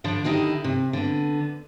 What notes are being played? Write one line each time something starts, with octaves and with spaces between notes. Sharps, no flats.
D3 F3 D4 B4
D3 D#3 D#4 E4 G4
C3
D3 B3